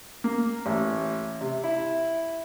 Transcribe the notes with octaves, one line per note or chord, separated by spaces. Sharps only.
A#3
A1
C3
E4